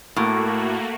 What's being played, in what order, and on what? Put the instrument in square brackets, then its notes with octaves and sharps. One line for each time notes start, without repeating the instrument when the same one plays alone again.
[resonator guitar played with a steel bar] A2 [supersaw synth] A3 A#3 F#4